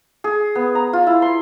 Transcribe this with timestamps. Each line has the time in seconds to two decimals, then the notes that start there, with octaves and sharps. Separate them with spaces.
0.24 G#4
0.55 B3
0.75 A#5
0.93 F4
1.07 E4
1.22 C6